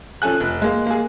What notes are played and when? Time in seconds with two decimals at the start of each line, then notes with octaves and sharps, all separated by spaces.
0.22 F3 C#4 A4 G#5 F#6
0.40 F1
0.62 G#3 A#3
0.87 A#3 G#4